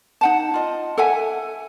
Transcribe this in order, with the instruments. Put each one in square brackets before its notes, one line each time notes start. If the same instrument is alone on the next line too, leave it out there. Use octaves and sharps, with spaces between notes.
[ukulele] D#4 F#5 A5
F4 D#5
A4 E5 F#5 G#5